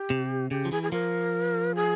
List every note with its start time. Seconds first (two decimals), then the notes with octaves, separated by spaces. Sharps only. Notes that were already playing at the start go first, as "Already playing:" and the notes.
Already playing: G4
0.10 C3
0.50 C#3 G4
0.65 F3
0.71 E3 G#4
0.83 G#4
0.92 F3 A#4
1.76 G#4